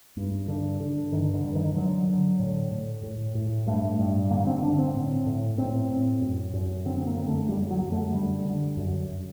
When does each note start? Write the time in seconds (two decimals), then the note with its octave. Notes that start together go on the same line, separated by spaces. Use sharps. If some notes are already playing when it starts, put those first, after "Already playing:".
0.17 G2
0.48 D3
0.80 D3
1.12 G2 D#3
1.34 D3
1.44 G2
1.55 D#3
1.75 D3 F#3
2.08 D3
2.40 A2
2.72 A2
3.03 A2
3.35 A2
3.67 G2 A3
3.99 G2
4.30 D3 A#3
4.47 C4
4.62 D3 D4
4.79 C4
4.94 A2
5.26 A2
5.58 A2 C4
5.90 A2
6.22 F#2
6.53 F#2
6.85 D3 C4
6.97 C4
7.07 A#3
7.17 D3
7.27 A3
7.49 F#2 G3
7.70 F#3
7.81 F#2
7.92 A3
8.12 D3 G3
8.45 D3
8.77 F#2